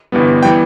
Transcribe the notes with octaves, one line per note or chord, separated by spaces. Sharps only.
G1 G2 E3 G3 B3
E3 G3 B3 G5